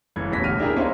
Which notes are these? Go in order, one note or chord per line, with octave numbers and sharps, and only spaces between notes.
F#1 E3 G#6
E1 A1 A#6 B6
D#1 D2 G4 F6 D#7
D4 E4 G4 G#4 A#4
A#3 C#4 D#4 C5 C#5 E5